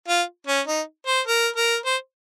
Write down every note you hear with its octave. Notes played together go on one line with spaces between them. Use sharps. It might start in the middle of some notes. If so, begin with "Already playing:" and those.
F4
C#4
D#4
C5
A#4
A#4
C5